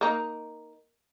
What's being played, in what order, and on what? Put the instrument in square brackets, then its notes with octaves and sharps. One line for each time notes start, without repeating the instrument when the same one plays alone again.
[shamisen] A#3 D#4